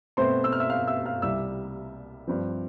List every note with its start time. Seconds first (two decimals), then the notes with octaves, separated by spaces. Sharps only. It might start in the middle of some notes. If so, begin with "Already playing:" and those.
0.17 B2 A3 C4 C5 C6
0.44 E6
0.52 F6
0.60 E5 E6
0.70 F5 F6
0.87 E5 E6
1.05 F5 F6
1.22 C2 C3 G3 E5 E6
2.27 G2 F3 C4